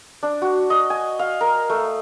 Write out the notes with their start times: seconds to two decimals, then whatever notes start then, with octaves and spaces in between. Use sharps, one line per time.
0.23 D4
0.42 F#4
0.70 D#5
0.90 G#5
1.19 F5
1.41 A#4
1.70 A3